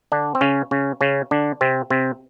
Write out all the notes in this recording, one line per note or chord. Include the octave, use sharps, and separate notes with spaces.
D3 D4
C4
C#3 C#4
C#3 C#4
C#3 C#4
D3 D4
C3 C4
C3 C4